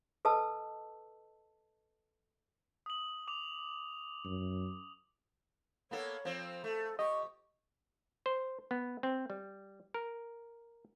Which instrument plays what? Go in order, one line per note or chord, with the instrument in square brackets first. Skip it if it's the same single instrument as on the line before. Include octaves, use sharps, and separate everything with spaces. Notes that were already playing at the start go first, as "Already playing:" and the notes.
[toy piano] A4 B4 D#5 A5 E6
[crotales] D#6 F#7
D6 F7
[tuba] F#2
[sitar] A#3 B3 A4 [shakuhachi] C#5
[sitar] F3 C4
[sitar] A3 [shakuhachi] A4
[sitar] G4 [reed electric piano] D#5 [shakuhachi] C#6
[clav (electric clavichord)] C5
B3
C4
G3
A#4